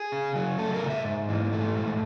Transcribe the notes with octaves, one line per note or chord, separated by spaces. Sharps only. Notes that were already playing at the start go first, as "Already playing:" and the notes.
Already playing: G#4
C#3
F#3
A3 A4
A#4
C#3
E5
G#2
E3
A3
G#2